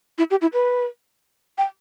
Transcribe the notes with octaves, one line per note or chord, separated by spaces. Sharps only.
E4
G4
E4
B4
G5